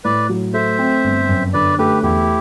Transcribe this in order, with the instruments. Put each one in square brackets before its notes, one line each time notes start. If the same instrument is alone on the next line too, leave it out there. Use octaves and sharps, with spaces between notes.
[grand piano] A2 [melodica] B4 D5
[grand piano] F#3
[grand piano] A3 [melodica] C5 E5
[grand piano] C4
G1
F#2
[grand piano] D3 [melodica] B4 D5
[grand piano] A3 [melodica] G4 B4
[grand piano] E2 [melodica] E4 G4